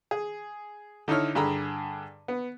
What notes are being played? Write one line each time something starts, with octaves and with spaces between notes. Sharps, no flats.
G#4
D3 D#4 E4 C#5 F6
G2 D3 G#4 A#5 B5
B3